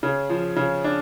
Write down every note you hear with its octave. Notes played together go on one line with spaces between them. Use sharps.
C#3
F3
C#3
D4